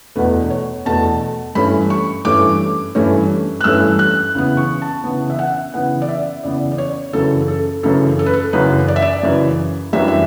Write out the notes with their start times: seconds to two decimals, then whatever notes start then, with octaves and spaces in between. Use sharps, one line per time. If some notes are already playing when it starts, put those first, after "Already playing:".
0.16 E2 B2 A3 B4
0.50 C#5
0.85 E2 B2 A3 A5
1.55 G2 E3 A3 C#4 B5
1.90 C#6
2.25 G2 E3 A3 C#4 D6
2.95 G2 E3 A3 C#4
3.61 F#6
3.64 G2 E3 A3 C#4 E6
3.99 F#6
4.35 C#3 E3 B3
4.57 C#6
4.82 A5
5.04 C#3 E3 B3
5.30 E5
5.39 F#5
5.74 C#3 E3 B3 F#5
6.02 D5
6.08 E5
6.43 C#3 E3 B3 D5
6.72 D5
6.78 C#5
7.13 F#2 C#3 E3 A4
7.48 A4
7.83 F#2 C#3 E3 A4
8.19 A4
8.26 B4
8.33 A4
8.53 F#2 C#3 E3 B4
8.88 D5
8.96 E5
9.02 D5
9.23 F#2 C#3 E3
9.93 F#2 E3 G3 D4 E5
10.08 E5